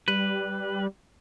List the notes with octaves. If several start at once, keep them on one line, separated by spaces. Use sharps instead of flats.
G3 B4